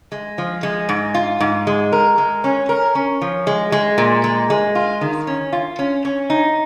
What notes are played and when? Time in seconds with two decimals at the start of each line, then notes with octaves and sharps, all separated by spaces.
0.12 G#3
0.38 F3
0.63 G#3
0.89 G#2
1.14 F4
1.40 G#2
1.67 G#3
1.93 A#4
2.18 G#3
2.44 C#4
2.69 A#4
2.95 C#4
3.22 F3
3.47 G#3
3.72 G#3
3.98 A#2
4.24 G#3
4.50 G#3
4.75 F4
5.01 D#3
5.27 C#4
5.53 F4
5.79 C#4
6.05 C#4
6.30 D#4